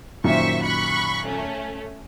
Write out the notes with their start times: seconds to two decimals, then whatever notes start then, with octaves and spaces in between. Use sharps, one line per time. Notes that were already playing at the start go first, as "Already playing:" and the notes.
0.24 F#2 A#2 D#3 C5 E5 C#6
0.63 B5 C#6 F#6
1.25 A3 C#4